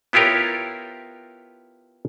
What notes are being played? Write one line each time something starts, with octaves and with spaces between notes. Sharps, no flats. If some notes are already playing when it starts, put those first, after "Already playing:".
B3 E4 F4 G4 A#4 C#5